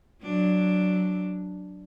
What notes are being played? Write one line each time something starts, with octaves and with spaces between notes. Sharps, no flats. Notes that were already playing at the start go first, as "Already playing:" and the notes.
F#3 D4